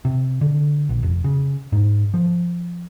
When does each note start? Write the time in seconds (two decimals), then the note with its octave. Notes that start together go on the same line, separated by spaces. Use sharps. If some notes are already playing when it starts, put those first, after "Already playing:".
0.05 C3
0.41 D3
0.89 A#1
1.03 F1
1.24 C#3
1.72 G#2
2.14 F3